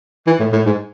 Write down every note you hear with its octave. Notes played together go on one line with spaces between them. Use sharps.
E3
A2
A2
G#2